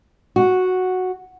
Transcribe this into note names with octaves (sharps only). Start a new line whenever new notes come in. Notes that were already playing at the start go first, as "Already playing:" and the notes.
F#4